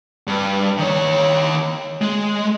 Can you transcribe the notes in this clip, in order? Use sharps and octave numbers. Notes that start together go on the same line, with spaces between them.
G2
D#3 C#5
G#3